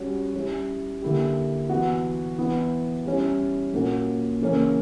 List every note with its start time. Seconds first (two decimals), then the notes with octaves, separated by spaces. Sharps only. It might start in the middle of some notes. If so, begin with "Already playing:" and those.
Already playing: G3 C#4 F#4
0.34 G3 C#4 E4
1.02 D3 A#3 E4 G4
1.69 E3 B3 F#4
2.38 E3 B3 E4
3.06 G3 C#4 E4
3.74 A#2 A#3 C#4 F#4
4.41 C#3 E3 A#3 C#4